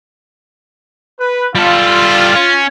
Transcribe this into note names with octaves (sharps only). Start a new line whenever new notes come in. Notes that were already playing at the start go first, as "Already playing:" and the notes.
B4
G3 F4 A4
C#4